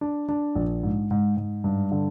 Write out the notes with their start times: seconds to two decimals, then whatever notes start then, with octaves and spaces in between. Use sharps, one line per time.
0.01 D4
0.29 D4
0.55 A#1
0.83 G#2
1.11 G#2
1.37 G#2
1.64 G2
1.91 D3